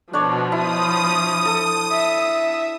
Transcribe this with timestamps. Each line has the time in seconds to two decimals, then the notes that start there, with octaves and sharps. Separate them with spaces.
0.13 B2 F3 D4 C#5 D5
0.52 E4 D#6
1.45 A4
1.92 E5